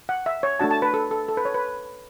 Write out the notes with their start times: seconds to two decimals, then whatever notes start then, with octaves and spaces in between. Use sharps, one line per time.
0.09 F#5
0.26 E5
0.43 C#5
0.60 A3 D4 F#4 A5
0.71 A5
0.82 B4
0.94 A4
1.11 A4
1.29 A4
1.37 B4
1.45 C#5
1.54 B4